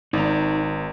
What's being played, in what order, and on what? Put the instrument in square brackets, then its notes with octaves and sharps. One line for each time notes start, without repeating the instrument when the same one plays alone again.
[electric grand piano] G#1 [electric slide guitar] D#4 D5 A#5